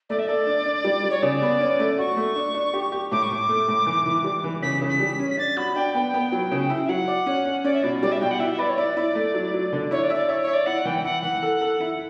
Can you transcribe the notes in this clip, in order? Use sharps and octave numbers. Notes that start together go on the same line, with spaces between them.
A3 D5
E5
A4 D5
D4
D4
G3
G3
C#5
C#3 D5
B3
C#4
A3
F#4 C#6
A3
D4
D4
G4
G4
A2 D6
C#6
A2 D6
A3
A2
E3
E3
G3
E3
C#3 B6
C#3
B6
G3
C#4
B6
D4 A6
F#4 B5
D4 G5
B3 G5
B3
F#3
C#3
E4
E5
F#3 F#5
D5
C#4
C#4
C#4 D5
E5
B2 D5
G3 D5
E5
B2 G5
F#5
E4 E5
E5
B4 D5
C#5
E4 D5
E4
A3
F#3
F#3
D3
E4 C#5
D5
E5
D5
C#5 E5
C#5
E5
D5
E4 F#5
E3 G5
E4 F#5
E3 F#5
A4
A4
E4